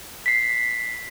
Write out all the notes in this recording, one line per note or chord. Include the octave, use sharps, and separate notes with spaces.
B6 C7